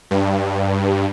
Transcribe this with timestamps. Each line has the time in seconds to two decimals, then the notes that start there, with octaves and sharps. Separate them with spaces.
0.11 G2